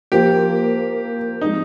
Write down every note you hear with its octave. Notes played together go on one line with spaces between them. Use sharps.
F3 A#3 F4 G4
F3 G#3 C4 D#4